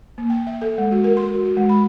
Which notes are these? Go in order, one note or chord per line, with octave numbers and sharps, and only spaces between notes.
A#3
G5
E5
A4
G#3
F#4
A#4
C6
F#4
F#4
G#3
B5